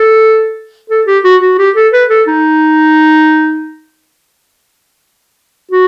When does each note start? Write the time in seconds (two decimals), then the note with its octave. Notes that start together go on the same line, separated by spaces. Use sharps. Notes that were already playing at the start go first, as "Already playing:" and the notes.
Already playing: A4
0.90 A4
1.07 G4
1.24 F#4
1.41 F#4
1.58 G4
1.76 A4
1.93 B4
2.10 A4
2.27 D#4
5.71 F#4